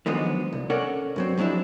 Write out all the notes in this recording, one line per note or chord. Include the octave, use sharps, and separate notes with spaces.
D3 D#3 F3 F#3 G#3 B3
C2
C#4 A4 A#4 D5 F#5
G2 F#3 C4
F3 F#3 G#3 D4 E4